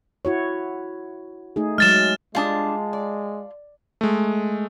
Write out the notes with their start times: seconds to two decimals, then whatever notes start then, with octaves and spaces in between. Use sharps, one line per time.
0.25 E4 F#4 C#5
1.56 A3 D#4 G#4
1.78 F#3 G#3 F6 A6 E7
2.35 G3 G#3 D4 F4 A5 D#6
2.93 D5
4.01 G#3 A3